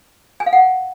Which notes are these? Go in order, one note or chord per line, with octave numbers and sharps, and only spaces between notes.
G#5
F5
F#5